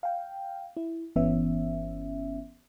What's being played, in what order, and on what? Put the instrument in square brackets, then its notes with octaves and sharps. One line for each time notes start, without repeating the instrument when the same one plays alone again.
[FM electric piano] F5 G5
E4
G1 E3 B3 C#4 E5